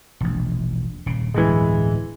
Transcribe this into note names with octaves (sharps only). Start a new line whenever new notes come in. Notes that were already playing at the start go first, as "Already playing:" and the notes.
E1 A#1
D#1 C#3
D1 E2 G2 E3 G#3